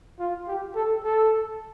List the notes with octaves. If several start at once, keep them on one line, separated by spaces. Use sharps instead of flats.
F4
G4
A4
A4